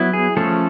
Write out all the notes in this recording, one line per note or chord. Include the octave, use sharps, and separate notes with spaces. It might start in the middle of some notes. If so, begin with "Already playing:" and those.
Already playing: F#3 B3 E4
G#4
F3 A3 C#4 A4